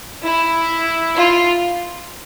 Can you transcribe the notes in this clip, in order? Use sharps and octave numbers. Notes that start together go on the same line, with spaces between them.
E4
F4